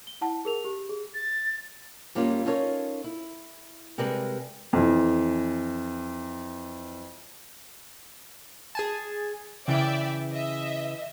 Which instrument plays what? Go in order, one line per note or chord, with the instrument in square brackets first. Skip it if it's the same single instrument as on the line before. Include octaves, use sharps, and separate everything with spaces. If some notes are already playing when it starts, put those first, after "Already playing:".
[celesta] G7
E4 F#5 A5
G#4 A#4 F7
G4
G#4
[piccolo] A6
[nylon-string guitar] F#2 G3 A#3 C#4 F4
C#4 D#4 F4 A4 A#4 C#5
E4
C3 G3 G#3 A#4 B4
[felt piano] F2 E3
[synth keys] G#4 G#5 A5
[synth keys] C#3 E3 [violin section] D5 E5 G5
[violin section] D#5 E5